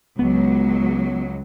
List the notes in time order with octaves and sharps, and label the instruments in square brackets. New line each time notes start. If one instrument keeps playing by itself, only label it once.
[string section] C#2 F#3 [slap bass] B3